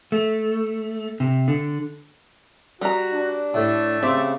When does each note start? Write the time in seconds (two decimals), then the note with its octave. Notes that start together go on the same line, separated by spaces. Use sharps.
0.12 A3
1.20 C3
1.48 D3
2.81 G3 F#4 A#5
3.12 D4
3.54 A2 A3
4.03 C#3 C4 G4 E5